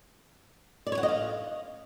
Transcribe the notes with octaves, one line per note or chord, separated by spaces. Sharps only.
D5
C#5
F#5
D#5
F5